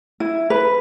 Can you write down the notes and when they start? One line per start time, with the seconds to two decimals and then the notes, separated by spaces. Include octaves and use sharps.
0.20 E4
0.50 B4